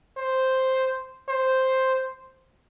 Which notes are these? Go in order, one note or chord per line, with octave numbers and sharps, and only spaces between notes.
C5
C5